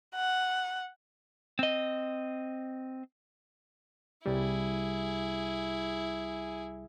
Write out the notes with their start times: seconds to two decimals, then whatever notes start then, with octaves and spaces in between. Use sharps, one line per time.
0.16 F#5
1.59 C4 D#5
4.26 C2 G3 E4 G#4